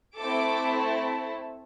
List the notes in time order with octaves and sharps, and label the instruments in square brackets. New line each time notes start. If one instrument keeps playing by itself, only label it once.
[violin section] A3 C4 E4 A4 D6